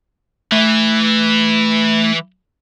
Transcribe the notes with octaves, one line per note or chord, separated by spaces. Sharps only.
E3 A3